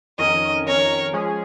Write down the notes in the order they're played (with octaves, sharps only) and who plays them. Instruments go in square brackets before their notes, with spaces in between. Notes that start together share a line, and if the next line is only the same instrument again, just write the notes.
[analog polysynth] F2 D#3 C#4 A#4 [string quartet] D#5
[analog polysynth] F2 D#3 C#4 A#4 [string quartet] C#5
[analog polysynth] F3 G#3 C#4 G#4